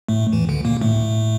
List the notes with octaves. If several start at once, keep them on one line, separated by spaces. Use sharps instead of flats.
A2 A3
E2 E3
D2 D3
A#2 A#3
A2 A3